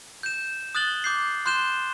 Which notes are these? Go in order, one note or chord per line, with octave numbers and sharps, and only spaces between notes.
G6 E7
D#6 F#6 A6 F#7 G7
D6 G6 C7
C6 F#6 G6 E7 G7